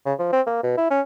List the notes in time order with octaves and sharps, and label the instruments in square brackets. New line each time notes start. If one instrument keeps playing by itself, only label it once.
[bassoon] C#3
F3
C4
A#3
B2
E4
C#4